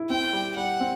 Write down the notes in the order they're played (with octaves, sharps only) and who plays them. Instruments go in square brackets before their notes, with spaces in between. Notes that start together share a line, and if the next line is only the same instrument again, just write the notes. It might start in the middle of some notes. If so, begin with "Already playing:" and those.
Already playing: [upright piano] E4
[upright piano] C4 [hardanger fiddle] G5
[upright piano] G3
[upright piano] G3 [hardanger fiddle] F#5
[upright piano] C4